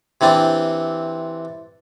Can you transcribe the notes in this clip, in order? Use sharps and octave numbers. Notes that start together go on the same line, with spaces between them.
C3 E3 C4 D4